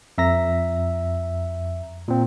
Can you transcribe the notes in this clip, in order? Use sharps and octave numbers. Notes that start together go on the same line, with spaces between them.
F2 E5 A#5 A#6
A#2 C4